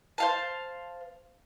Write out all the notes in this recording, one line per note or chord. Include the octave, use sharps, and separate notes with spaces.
C5 F5 A5